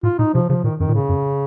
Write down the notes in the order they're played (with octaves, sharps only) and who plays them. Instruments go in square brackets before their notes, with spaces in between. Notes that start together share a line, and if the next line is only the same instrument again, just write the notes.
[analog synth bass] A2 [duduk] F4
[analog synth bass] A#2 [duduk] D#4
[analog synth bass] C3 [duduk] F3
[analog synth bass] C#3 [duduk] F3
[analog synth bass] A#2 [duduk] D#3
[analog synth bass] F#2 [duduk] D#3
[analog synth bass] A#2
[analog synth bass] A2 [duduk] C#3
[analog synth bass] F#2